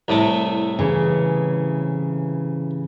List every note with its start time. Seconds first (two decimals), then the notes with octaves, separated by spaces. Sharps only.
0.08 C2 A2 A3
0.79 C#3 E3